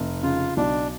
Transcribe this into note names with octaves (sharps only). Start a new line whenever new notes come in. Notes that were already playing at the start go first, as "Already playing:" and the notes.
Already playing: F1
C#3 F4
B1 D4